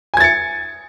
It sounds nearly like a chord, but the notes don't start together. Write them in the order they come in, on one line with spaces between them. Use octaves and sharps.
G#5 G#6 A6 C#7